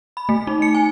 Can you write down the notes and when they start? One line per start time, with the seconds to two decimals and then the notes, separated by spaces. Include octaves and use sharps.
0.17 B5
0.29 A3
0.47 D#4
0.62 C#7
0.75 G#5